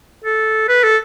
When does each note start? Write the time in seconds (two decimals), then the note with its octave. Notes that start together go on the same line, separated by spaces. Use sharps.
0.24 A4
0.68 B4
0.84 A4